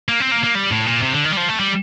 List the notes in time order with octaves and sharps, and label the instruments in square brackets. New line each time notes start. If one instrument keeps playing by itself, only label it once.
[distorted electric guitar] A#3
C4
A#3
A#3
G3
A2
A#2
C3
D3
D#3
G3
F3
A3
G3